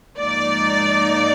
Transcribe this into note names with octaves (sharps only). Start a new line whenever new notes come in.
G#2 F3 A#3 D#4 D5